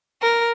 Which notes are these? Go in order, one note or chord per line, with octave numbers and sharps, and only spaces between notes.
A#4